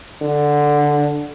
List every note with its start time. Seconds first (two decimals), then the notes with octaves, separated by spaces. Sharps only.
0.22 D3